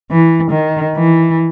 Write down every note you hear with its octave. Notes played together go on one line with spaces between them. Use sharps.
E3
D#3
E3